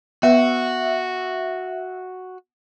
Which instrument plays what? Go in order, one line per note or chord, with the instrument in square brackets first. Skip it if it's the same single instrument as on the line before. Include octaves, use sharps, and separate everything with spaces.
[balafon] B3 B4 [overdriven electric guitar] F#4 [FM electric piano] E5